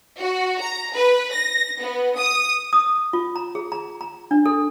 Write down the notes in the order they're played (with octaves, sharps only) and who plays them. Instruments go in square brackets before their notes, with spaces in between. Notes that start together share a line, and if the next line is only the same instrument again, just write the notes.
[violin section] F#4
A#5
B4
A#6
B3
D#6
[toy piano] D#6
F4
A#5
G#4
A#5
A#5
D4
A4